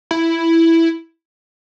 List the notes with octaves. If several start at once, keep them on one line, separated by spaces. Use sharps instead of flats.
E4